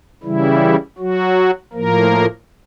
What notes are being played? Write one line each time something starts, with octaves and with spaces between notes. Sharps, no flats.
C#3 E3 G3 E4
F#3 F#4
A2 F3 A#3 A#4